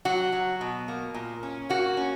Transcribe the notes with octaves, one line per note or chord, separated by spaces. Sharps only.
F#3 F#4
F#3
B2
A#3
A#2
C#4
A#3 F#4
C#4